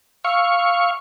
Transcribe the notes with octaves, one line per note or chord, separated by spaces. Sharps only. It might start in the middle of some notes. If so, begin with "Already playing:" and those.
F5 C#6 E6